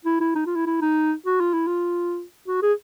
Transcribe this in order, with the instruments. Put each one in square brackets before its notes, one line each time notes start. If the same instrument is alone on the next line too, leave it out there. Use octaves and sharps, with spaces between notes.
[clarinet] E4
E4
D#4
F4
E4
E4
D#4
F#4
F4
E4
F4
F#4
G#4